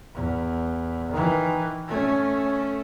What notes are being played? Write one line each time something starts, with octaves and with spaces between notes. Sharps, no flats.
E2
D#3 E3
A3 C#4